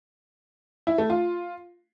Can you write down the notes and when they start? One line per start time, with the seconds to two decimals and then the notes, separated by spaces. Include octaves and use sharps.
0.87 E4
0.98 A3
1.10 F4